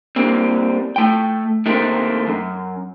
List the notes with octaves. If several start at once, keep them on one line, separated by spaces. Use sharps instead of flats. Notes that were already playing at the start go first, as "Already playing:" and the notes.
G3 A#3 C4
A3 G5
D#3 A3 A#3 C4
F#2